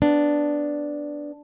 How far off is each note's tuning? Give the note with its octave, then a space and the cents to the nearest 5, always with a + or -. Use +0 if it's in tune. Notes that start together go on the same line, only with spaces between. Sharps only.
B3 +10 D4 +0